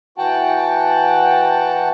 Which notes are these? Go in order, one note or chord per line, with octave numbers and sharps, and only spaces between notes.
E3 F#4 F#5 G5 A5